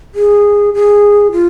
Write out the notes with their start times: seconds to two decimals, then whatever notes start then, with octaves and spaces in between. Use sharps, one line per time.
0.15 G#4
0.74 G#4
1.32 F4